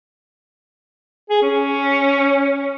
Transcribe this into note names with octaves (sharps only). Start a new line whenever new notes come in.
G#4
C#4